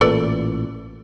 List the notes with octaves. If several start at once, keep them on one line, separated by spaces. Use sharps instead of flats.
A1 A#2 E3 A4 B4 D5